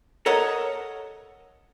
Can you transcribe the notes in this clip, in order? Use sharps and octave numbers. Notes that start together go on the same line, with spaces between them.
A4 A#4 C#5 D#5 F#5 A#5